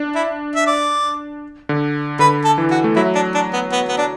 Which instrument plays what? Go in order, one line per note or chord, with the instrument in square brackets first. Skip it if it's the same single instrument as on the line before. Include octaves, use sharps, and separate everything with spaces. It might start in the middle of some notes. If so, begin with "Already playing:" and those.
Already playing: [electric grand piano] D4
[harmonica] E4
E5
D5
[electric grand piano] D3
[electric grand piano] D3 [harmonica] B4
[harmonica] A4
[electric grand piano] E3
[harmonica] F#4
[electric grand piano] A3
[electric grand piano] F#3 [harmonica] E4
[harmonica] D4
D4
B3
B3
B3
D4